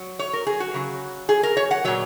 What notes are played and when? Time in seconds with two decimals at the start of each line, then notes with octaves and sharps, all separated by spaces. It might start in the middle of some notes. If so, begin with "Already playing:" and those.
Already playing: F#3
0.19 C#5
0.33 A#4
0.47 G#4
0.60 F#4
0.74 C#3 F#3
1.29 G#4
1.43 A#4
1.57 C#5
1.71 F#5
1.85 A#2 F#3 C#5